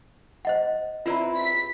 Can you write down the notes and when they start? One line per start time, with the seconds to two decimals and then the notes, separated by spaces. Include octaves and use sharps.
0.45 C5 D#5 F#5
1.06 C4 E4 F4 B4 D5 A#5
1.37 B6